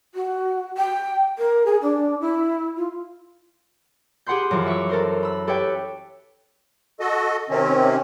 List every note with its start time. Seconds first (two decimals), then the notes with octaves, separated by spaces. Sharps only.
0.15 F#4
0.77 G5
1.38 A#4
1.65 G#4
1.82 D4
2.21 E4
2.77 F4
4.26 G4 G#4 F#5 B5 C6 G6
4.51 F#2 E3 F3
4.66 E5 C#6 D6 E6
4.89 A4 A#4 C5
5.23 B5 E6
5.47 G4 A4 B4 C#5 E5 G5
7.00 F#4 A4 D#5
7.50 C3 D#3 C4 C#4